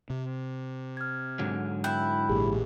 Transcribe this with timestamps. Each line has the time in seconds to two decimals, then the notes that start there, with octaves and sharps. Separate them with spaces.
0.10 C3
0.97 F6 G#6
1.39 G#2 D3 F#3
1.84 E4 G5 F#6 G6
2.29 A1 A#2 G4 G#4